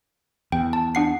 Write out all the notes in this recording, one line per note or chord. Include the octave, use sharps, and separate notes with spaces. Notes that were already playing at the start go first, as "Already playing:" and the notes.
E2 G5
A5
D4 F#5 C7